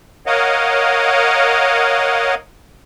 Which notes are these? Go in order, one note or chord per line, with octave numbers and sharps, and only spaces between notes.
A#4 C#5 D#5 F5 F#5